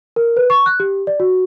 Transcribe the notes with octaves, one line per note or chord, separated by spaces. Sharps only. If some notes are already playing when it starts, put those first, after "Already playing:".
A#4
B4
C#6
F#6
G4
D5
F#4